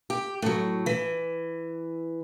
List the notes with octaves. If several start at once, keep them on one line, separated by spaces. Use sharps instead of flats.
G4
A2 F#3
E3